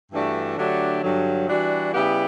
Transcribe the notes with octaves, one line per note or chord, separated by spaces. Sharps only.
G2 E3 A3 D4 F#4
D3 F#3 A3 D4 G4
G2 D3 F#3
E3 G3 D4 F#4
C#3 G3 B3 E4 G4